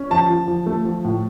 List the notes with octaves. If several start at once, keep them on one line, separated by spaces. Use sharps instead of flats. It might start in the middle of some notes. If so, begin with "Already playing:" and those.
Already playing: C#4
F3 A5
F3
F3
A3
F3
A2